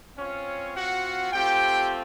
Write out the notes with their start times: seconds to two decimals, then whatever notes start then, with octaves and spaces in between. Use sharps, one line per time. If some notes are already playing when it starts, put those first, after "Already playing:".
0.17 C4 C#4 F4 C#5
0.75 F#4 F#5
1.32 A3 C4 F4 G4 G5